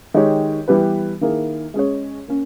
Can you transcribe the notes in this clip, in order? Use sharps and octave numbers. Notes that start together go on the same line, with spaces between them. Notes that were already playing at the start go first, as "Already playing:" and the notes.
D#3 G#3 D#4 G4 C#5
E3 G3 B3 G4 B4
D#3 A#3 E4 G#4
G#3 C#4 G#4 C#5
A#3 C#4